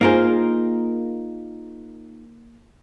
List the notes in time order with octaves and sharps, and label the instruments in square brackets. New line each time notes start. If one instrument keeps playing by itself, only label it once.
[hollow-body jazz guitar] A#3 A#4 C5 [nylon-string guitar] D#4 F4 G#4